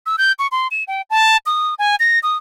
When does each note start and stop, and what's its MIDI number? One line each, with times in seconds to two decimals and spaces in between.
0.06 0.16 88
0.18 0.32 91
0.39 0.47 85
0.52 0.67 84
0.71 0.84 100
0.88 1.02 79
1.10 1.37 81
1.46 1.74 87
1.79 1.96 80
2.00 2.19 94
2.23 2.37 87